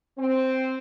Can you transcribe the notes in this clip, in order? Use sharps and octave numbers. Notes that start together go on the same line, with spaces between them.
C4